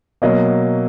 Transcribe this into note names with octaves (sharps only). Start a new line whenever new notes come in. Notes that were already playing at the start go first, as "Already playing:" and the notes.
B2 F#3 A#3 D#5